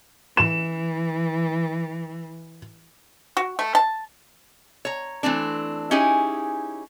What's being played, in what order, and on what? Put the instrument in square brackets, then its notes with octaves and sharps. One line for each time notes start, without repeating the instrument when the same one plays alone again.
[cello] E3 [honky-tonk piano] E7
[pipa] F#4
A3
A5
[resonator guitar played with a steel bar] C#5 A#5
E3 A3 C4 D4
C#4 D#4 E4 G4 G#4